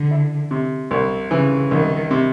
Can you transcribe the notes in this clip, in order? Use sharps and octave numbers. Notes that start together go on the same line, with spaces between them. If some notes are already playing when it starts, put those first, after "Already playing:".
Already playing: D3
E4
C3
C2
C#3 E3
C2 D#3
C3